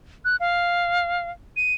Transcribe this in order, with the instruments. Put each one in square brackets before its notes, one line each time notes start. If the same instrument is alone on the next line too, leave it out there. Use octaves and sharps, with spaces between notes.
[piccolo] F#6
F5
D#7